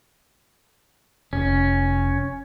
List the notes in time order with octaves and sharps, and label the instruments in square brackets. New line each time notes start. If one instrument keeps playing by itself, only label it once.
[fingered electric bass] F1 [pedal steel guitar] C#4